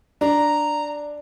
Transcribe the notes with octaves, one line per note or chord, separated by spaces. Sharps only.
D4 D5 A#5